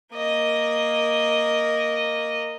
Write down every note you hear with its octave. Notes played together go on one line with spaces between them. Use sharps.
A#3 D#5